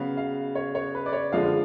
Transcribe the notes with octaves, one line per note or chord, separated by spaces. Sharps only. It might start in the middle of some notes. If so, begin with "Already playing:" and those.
Already playing: C#3 F#3 B3 F5
F5
C#5
C#5
B4
D5
C#5
F#2 D3 F3 G#3 F5